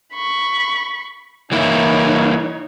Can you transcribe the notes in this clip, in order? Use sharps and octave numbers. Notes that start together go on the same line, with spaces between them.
B5 C#6
E3 A#3 D#4 E4 C#5